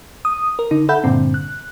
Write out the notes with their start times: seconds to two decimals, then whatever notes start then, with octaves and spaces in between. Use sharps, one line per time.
0.25 D#6
0.59 A#4
0.71 D3 D#4
0.89 A4 E5 F#5 B5 G6
1.04 G2 A#2 D3 C4
1.34 F#6